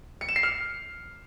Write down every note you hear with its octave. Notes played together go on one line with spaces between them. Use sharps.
C#7
E7
C7
F6